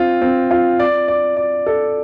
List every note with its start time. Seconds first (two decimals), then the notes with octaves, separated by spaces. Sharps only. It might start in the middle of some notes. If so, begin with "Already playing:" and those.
Already playing: C4 F4
0.22 C4
0.51 F4
0.79 D5
1.08 D5
1.36 D5
1.66 A4